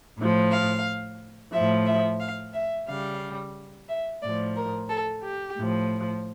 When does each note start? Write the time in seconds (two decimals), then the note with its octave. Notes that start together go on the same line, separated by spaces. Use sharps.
0.18 A2 F3
0.51 F5
1.52 A2 F3 E5
1.86 E5
2.20 F5
2.54 E5
2.87 C#3 G3 F5
3.88 E5
4.22 A2 F3 D5
4.55 A#4
4.89 A4
5.22 G4
5.57 A2 F3